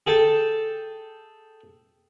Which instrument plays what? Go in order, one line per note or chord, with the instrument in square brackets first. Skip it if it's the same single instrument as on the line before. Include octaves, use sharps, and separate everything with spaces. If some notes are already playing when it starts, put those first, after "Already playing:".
[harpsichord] G#4 A4 G5 A5